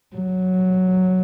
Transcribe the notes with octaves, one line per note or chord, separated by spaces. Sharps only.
F#3